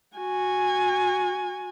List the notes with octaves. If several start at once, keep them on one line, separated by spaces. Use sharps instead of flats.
F#4 G#5